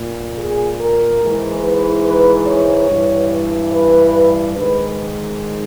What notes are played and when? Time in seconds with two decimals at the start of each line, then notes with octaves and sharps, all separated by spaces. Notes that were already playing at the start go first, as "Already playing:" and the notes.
Already playing: A#2
0.38 G#4
0.80 A#4
1.22 G#2 E3
1.64 B4
2.05 B4
2.47 C#5
2.88 G2 E3
3.72 B4
4.56 G#2 D#3 B4